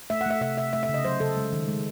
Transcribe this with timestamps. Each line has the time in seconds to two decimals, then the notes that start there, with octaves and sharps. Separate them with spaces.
0.10 A3 E5
0.21 F#5
0.26 A3 E5
0.41 C3 E5
0.57 C3 E5
0.73 A3 E5
0.83 E5
0.89 C#3
0.94 D#5
1.05 F#3 C5
1.20 C#3 A4
1.37 G#3
1.52 D#3
1.68 G#3